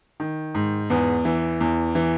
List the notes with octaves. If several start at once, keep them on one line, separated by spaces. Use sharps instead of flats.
D#3
G#2
E2 B3
E3
E2
E3